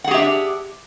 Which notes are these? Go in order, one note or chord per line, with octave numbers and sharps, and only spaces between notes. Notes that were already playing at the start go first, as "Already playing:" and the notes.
D4 G4 G#4 E5 F#5